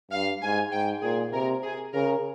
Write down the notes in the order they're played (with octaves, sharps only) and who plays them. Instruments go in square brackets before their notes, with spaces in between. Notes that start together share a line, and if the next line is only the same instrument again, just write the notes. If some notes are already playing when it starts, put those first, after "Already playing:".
[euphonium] G2 [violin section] F5
[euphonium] G#2 [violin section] G#5
[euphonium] G#2 [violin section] G5
[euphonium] A#2 [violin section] G#4
[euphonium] C3 [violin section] A#4
[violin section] G#4
[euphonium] C#3 [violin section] A#4